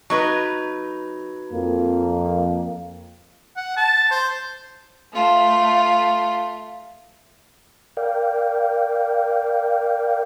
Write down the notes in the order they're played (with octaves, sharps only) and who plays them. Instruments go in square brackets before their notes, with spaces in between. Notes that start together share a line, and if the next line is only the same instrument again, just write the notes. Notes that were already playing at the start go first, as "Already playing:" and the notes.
[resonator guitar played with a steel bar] F#3 D#4 B4
[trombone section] F2 A#3
[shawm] F#5
A5
C5
[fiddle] A3 F4
[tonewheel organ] A#4 D5 F5 G5